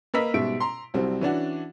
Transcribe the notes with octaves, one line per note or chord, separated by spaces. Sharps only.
A#3 A#4 B4 D#5 E6 B6
G#2 B2 G3 E5 D7
A#5 C6
C2 F#3 G3 C4
E3 C#4 D4 F#4